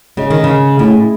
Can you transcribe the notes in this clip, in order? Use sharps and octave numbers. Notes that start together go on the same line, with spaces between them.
C#3 G#3 C#4 G#4 D#5
D#3
C#3
A2 A3 E4 G#4